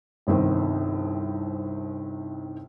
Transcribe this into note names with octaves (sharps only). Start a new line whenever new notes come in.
G1 C2 D#3 C4